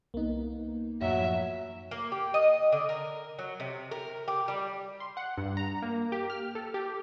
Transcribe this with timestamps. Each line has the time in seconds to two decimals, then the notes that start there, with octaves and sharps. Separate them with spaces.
0.14 C2 A#3 B3 D#4
1.02 F#2 A2 F3 F#3 E5
1.91 A#3
2.12 G4
2.34 D#5
2.72 D3
2.89 A#4
3.39 F#3
3.60 C3
3.91 A#4
4.28 G4
4.48 G3
5.00 C6
5.17 F#5
5.38 G2
5.57 A#5
5.82 A#3
6.12 G4
6.30 F6
6.55 A4
6.74 G4